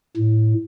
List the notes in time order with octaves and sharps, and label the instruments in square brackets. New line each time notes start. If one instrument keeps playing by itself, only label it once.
[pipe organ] A2